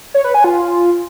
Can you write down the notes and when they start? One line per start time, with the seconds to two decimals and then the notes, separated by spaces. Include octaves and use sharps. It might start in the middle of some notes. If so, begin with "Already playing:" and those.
0.14 C#5
0.24 B4
0.34 G#5
0.44 F4